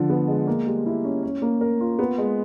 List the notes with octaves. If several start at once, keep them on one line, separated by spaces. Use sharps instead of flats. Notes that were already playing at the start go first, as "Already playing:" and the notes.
Already playing: D3 F3
B3
G#3
A#3
G3
E4
C#4
C#4
A#3
A#4
F4
B3
G#3